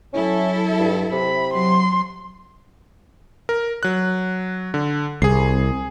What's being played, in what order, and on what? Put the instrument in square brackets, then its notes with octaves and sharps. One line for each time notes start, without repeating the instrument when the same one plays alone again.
[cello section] F#3 E4 A4 [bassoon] C#4
[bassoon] G2
[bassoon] C3 [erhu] B5
[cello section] F#3 [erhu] C6
[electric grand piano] A#4
F#3 F#6
D3
[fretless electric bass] C2 [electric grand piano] G#4 C7